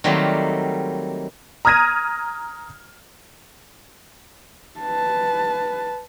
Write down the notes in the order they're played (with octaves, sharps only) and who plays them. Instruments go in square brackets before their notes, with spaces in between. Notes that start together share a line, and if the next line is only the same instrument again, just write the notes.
[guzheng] D#3 F#3 G3 A3 A#3 C4
[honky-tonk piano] A#5 D#6 F6 G#6 A#6 D#7
[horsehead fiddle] B4 A5